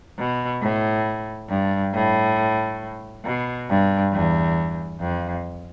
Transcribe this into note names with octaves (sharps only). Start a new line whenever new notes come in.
B2
A2
G2
A2
B2
G2
E2
F2